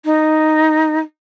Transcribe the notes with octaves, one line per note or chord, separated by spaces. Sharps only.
D#4